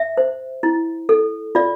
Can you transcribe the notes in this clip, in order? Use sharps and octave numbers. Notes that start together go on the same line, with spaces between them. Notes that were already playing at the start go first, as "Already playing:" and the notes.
Already playing: E5
C5
E4
A4
F4 D5